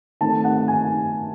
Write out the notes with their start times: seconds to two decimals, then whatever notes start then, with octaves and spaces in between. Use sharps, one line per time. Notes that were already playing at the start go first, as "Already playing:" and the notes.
0.21 D#3 A3 C4 A5
0.44 F#5
0.68 G#5